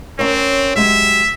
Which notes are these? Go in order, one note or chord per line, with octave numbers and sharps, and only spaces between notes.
C4 C#4 A#4 C#5
F#3 G#3 G4 E5